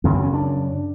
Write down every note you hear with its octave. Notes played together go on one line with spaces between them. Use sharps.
F#2 C#3 C4
C4
C#4
D4